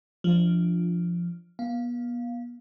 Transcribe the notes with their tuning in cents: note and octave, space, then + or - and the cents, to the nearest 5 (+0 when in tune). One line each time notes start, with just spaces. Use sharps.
F3 -10 D4 +0
B3 -35 F5 +0